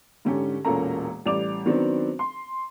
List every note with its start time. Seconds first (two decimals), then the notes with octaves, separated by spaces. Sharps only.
0.25 G#2 D3 C#4 G4
0.65 E1 A#2 A#3 C#4 A4 A#5
1.26 A1 G3 D5 D6 F7
1.66 D#3 F#3 B3 C4 D4
2.19 C6